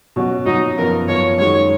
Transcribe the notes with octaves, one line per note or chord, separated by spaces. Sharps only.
B2 F#3 C#4 F#4
B2 F#3 C#4 D#4 F#4
F#2 F3 B3 A#4
F#2 F3 B3 C#5
F#2 D#3 G#3 D#4 F#4 C#5